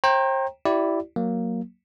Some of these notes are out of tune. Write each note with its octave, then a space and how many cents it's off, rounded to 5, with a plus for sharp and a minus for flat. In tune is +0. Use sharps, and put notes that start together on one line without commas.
C5 +40 G5 +0 A#5 +0
E4 +0 G4 -35 D5 +0
F#3 +0 A#3 +0